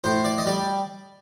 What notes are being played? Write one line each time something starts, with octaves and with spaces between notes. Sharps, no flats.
A2 C5
D5
D#5
G3 D5